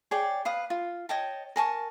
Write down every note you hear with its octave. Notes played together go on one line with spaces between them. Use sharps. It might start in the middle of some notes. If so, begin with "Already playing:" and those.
G#4 C#5 D5 G5
B4 F5 D#6
F4
C#5 D#5 G5 A5
A#4 G#5 A5 C#6